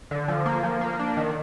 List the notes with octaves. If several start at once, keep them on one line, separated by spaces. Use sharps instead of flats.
D3
F3
A#3
F3
A#3
D4
D#3